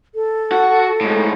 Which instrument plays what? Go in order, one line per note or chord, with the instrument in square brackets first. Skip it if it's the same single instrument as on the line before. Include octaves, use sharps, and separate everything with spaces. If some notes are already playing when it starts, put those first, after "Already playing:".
[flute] A4
[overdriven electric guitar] F#4 F#5
A2 G#3